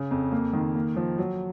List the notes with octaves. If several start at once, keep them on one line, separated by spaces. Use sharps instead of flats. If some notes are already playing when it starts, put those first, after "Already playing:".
Already playing: C#3
F2
A#3
D#3
A#3
F3
F#3